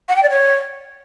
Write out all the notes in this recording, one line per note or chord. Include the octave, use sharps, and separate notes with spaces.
F#5
G5
D5
C#5